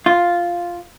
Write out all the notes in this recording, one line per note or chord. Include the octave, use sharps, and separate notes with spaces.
F4